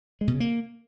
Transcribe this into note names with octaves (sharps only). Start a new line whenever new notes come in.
G#3
B2
C#3
A#3